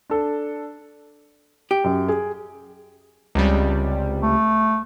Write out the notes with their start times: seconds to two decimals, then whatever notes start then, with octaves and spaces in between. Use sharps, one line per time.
0.10 D4 A4
1.71 G4
1.84 F#2
2.08 G#4
3.35 C#2 C3 G3
4.22 A3